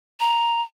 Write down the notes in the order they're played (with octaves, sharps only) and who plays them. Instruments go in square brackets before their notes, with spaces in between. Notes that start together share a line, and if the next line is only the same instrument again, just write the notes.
[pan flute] A#5